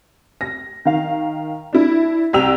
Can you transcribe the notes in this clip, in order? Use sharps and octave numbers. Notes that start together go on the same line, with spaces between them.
A#6
D#3 F5
D4 E4
C2 C4 G5 E6 F7